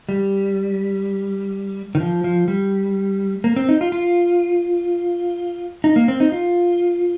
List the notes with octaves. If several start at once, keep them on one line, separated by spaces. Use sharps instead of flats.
G3
D#3
F3
F3
G3
A#3
C4
D#4
F4
F4
D#4
A#3
C4
D#4
F4